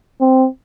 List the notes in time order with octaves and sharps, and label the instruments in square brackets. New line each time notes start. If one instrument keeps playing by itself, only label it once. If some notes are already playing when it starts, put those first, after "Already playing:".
[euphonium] C4